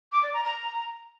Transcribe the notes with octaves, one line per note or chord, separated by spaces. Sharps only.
D6
D5
A#5
A#5